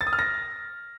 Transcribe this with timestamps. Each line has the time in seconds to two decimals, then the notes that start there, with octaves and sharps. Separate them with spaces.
0.01 A6
0.07 D#6
0.13 F6
0.19 A#6